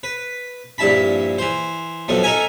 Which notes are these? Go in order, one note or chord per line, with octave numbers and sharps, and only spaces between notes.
B4
A#1 G2 E4 A5 B5
E3 C5
B1 F2 B2 A3
D#4 A4 A#4 E5 G#5